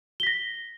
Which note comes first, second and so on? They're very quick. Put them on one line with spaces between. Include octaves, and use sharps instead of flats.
G7 B6 A#6